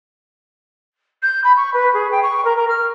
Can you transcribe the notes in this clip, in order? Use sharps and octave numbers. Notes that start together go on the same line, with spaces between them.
G6
B5
C#6
B4
G#4
G5
C#6
A#4
A#4
F6